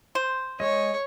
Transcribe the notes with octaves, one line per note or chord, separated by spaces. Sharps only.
C5
G#3 C#5 D#5